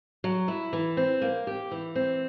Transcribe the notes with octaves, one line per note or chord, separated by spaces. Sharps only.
F#3
E4
E3
C4
A#3
G4
E3
C4